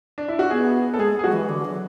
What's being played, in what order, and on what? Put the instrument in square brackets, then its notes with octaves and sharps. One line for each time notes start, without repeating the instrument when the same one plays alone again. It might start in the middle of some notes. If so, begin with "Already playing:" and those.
[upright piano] D4
E4
F#4
[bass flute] B3 [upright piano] G#4
[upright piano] A4
[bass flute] G#3 [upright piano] G#4
[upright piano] G#4
[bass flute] F#3 [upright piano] F#4
[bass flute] E3
D3
F#3